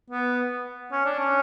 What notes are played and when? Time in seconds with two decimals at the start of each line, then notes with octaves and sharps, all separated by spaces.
0.10 B3
0.92 C#4
1.05 D4
1.19 C#4